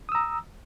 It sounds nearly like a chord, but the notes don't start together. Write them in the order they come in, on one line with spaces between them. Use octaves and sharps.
D#6 E6 A#5